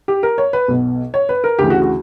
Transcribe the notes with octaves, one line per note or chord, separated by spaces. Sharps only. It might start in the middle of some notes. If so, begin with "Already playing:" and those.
G4
A#4
C#5
B4
B1 B2
C#5
B4
A#4
D2 C#3 E3 G4
F#4
F#4